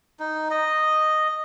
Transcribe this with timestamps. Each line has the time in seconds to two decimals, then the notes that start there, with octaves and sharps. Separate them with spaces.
0.20 D#4
0.51 D#5